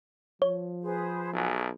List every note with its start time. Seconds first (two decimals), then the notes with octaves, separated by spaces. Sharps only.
0.42 F3 C#5
0.82 G#4 B4 C5
1.33 B1 F#4 G#4 G#5